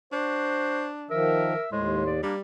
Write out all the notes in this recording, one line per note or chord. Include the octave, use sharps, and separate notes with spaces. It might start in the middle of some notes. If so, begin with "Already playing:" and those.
D4 F#4 C5
D#3 F3 A#4 E5
D#2 A2 G#3 C5
D5
G3 A#3 D4